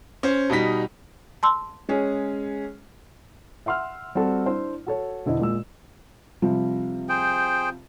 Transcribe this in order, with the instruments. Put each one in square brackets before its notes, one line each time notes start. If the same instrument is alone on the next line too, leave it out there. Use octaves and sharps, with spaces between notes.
[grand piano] C#4 C5
B2 G3 D#4 B6
[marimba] A5 C6 E6
[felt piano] G#3 C#4 G#4
[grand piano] E5 F#5 C6 E6 F6
G3 C4 F#4 A4
D4 E4 C5
F#4 A4 C#5
E1 D3 E4 C5 D5 D#5
A#2 G#3 E6
[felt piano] C3 F3 G3
[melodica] G#4 C5 G5